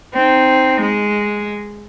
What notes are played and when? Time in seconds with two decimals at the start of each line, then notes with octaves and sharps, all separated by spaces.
0.14 C4 D#4
0.81 G#3